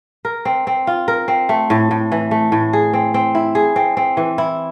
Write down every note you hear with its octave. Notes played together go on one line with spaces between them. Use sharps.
A#4
C4
C4
F4
A#4
C4
A3
A2
A2
E3
A3
A2
G#4
C4
C4
E4
G#4
C4
C4
E3
E4